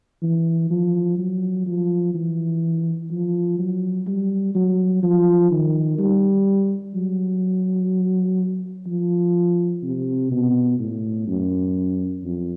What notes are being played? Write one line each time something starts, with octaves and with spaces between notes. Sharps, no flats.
E3
F3
F#3
F3
E3
F3
F#3
G3
F#3
F3
D#3
G3
F#3
F3
C3
B2
A2
F#2
F2